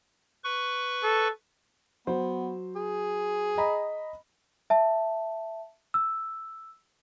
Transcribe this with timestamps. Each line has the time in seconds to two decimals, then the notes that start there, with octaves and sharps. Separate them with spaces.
0.44 B4 C#6
1.03 A4
2.07 F#3 B3 C5
2.76 G#4
3.58 D#5 A#5 B5
4.70 E5 A5
5.94 E6